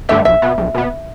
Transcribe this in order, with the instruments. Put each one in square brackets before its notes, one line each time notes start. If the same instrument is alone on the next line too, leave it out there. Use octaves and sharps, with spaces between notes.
[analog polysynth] G2 D3 A3 G4 [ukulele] E5
[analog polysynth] B1 [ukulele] E5
[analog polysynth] B2 B3
B1
B2 B3